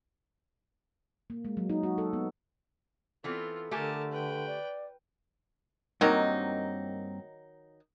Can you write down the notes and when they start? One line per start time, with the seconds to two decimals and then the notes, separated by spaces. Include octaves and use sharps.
1.30 A#3
1.45 G#3
1.57 F#3
1.70 D#4
1.83 F#4
1.98 A4
2.13 B3
3.24 E3 B3 C4 F4 A4
3.71 D3 A3 G4 A#4 G#5 A5
4.12 B4 G5
4.47 D5
6.01 G2 D#3 F#3 A#3 C4 D#4